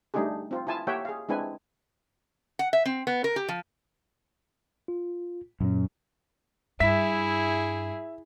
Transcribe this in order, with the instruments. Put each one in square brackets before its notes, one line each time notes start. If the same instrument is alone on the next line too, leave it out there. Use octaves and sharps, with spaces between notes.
[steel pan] G3 A3 D4 D#4 G4 G#4
C4 F4
E4 F4 G#5 A5
A#3 G4 C#5 E5 F#5 G5
G#4 F5
G#3 C4 D4 E4 B4 G#5
[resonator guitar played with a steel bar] F#5
E5
C4
B3
A#4
G4
F3
[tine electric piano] F4
[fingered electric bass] F#2 [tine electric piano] A#2 C#4
[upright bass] G2 [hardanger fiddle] E4 G#4 [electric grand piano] E5 B6